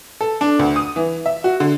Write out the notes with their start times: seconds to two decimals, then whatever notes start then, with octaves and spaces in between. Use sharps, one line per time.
0.21 A4
0.41 D4
0.59 D2
0.76 D#6
0.96 E3
1.26 E5
1.44 F#4
1.60 D3